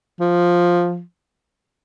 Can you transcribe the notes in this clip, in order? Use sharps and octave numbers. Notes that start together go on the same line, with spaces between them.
F3